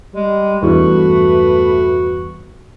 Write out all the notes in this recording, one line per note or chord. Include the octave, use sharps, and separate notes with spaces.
G3 G#3
B1 E2 G2 A3 F#4 B4